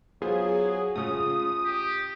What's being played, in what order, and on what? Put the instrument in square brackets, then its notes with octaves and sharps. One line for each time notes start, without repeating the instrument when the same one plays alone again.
[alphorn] F#3 [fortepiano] B3 F4 C5 [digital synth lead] G#4
[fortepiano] A2 C#3 [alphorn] F4 [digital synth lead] D#6
[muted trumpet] G4